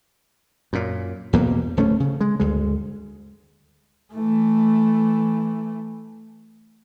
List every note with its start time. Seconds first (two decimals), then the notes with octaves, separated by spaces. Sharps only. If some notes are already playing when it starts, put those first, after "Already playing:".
0.73 F#2 A#2
1.33 E2 G2 B2 A#3
1.77 D1 A3 C#4
2.00 C#3
2.21 G#3
2.40 D2 G2 G#3
4.13 E3 A3